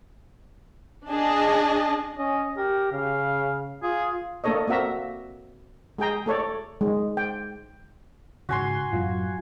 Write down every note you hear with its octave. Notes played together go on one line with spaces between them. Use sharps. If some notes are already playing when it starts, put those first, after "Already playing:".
D4 G#4 D#5 A5
C#4 D#5
G4 A#4
C#3 F5
F4 G#4
A3 A#3 D4 A4 C#5 D#5
A#3 C4 F#4 E5 A#5
G#3 G#4 G5 A#5
A3 A4 C#5 D5
G#3
G5
G#2 C#3 F#4 G#5 C6
F#2 A2 F#3 F4